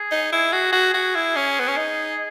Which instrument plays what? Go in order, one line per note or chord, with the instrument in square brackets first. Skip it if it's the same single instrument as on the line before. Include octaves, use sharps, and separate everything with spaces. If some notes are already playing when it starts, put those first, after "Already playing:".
Already playing: [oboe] G#4
[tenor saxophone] D#4
E4
F#4
F#4
F#4
E4
C#4
B3
C#4
D#4